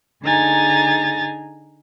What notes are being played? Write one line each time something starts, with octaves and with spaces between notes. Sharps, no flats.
D3 D#4 G#4 G#5 A#5 A6